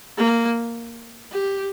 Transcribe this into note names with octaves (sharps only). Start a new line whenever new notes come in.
A#3
G4